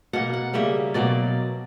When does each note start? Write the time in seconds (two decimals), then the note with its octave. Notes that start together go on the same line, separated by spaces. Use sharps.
0.13 B2 A#3 F#5
0.34 F#5
0.53 C#3 G3 A#3 E5
0.94 B2 F#3 A#3 D5